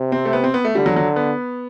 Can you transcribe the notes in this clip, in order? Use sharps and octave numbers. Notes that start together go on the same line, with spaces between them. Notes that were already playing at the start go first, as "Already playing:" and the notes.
Already playing: C3
C4
A3
B3
C4
B3
A3
D3 G3
F#3
F#3
B3